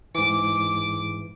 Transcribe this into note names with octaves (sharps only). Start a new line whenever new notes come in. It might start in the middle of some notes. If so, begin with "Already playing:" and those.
G#2 E3 D6